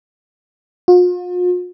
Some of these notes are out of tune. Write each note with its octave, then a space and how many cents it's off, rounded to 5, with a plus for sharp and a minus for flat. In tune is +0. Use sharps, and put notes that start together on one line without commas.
F4 +45